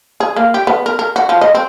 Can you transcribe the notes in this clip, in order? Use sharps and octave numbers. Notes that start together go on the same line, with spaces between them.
G#4
A#3
G4
B3
A#4
A#4
F#4
F3
D#5
C4